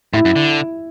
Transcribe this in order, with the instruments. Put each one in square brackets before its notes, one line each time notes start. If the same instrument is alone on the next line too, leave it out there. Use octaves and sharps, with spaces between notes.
[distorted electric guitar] A2 [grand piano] E4
[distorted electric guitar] F#2
D3